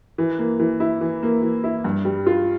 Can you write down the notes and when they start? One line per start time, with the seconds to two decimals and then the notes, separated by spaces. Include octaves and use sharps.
0.18 E3
0.39 A#3
0.59 E3
0.80 E4
1.01 E3
1.23 A#3
1.42 E3
1.64 E4
1.84 G2
2.05 G3
2.27 F4